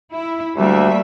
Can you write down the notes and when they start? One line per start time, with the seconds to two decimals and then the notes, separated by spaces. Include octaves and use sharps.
0.13 E4
0.57 D2 G3 A#3 E5